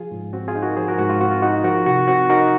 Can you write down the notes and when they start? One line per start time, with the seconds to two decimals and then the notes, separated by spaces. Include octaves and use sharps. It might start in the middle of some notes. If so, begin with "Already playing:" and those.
Already playing: F3 F4 G#4
0.11 G#2
0.33 C4 F#4
0.48 F4 G#4
0.55 D#4
0.62 F#4 A#4
0.77 F3 G#4 C5
0.88 F#4 A#4
0.98 G#2 F#4
1.10 F4
1.21 C4 F#4
1.31 F4
1.42 D#4 F#4
1.64 F3 F#4 A#4
1.86 C3 F#4
2.08 C4 F#4
2.29 D#4 F#4 A#4